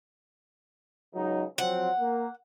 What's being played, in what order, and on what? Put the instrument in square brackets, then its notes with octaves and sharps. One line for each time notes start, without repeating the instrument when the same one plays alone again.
[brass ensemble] C#2 F#3 D#4
[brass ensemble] F3 F#3 C4 [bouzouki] F#5
[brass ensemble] A#3